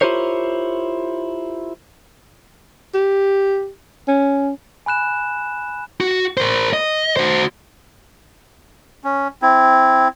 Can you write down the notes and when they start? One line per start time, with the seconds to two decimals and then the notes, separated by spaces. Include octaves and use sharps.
0.01 E4 F4 G4 A#4 C5 C#5
2.94 G4
4.08 C#4
4.86 G#5 B5 F#6 E7
6.01 F#4
6.37 A#4 C5
6.73 D#5
7.17 F#4 C5
9.04 C#4
9.42 C4 E4